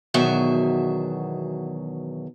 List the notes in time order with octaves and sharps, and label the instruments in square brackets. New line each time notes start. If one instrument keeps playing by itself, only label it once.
[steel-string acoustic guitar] E2 B2 D#3 F#3 E5 G#5